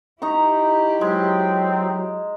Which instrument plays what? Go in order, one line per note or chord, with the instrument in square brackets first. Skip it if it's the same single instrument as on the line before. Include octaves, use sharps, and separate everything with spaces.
[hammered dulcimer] D#4 A#5 C#6 [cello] E4 G4
[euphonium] F#3 [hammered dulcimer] G#3 [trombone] C4